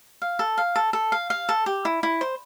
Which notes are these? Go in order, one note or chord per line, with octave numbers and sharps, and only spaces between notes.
F5
A4
F5
A4
A4
F5
F5
A4
G4
E4
E4
C5